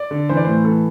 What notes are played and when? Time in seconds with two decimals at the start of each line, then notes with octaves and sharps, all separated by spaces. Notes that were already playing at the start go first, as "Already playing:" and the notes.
Already playing: D5
0.11 D3
0.29 E3 C5
0.37 D5
0.45 A2 C5
0.64 E3 A4